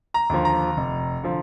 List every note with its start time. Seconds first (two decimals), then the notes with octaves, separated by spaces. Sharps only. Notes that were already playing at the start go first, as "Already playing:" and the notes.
0.14 A#5
0.29 D#2 D3 F3
0.45 A#5
0.77 F1
1.23 D3 F3